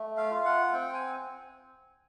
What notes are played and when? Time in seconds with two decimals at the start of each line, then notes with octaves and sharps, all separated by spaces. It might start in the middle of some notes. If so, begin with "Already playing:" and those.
Already playing: A3
0.17 F5
0.31 F4
0.45 F#5
0.73 C4 G5
0.94 G#5